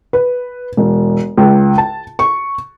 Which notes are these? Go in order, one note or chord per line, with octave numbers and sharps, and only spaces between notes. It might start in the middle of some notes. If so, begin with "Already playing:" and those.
B4
E1
C#2
A5
C#6